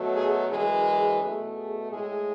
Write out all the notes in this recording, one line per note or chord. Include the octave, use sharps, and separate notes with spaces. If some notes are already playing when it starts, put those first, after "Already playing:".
Already playing: B2 F#3 A3
G#4
F#2 E3 G#3 G#4
G#4
B2 A3 G#4
G#4
A2 G#3 G#4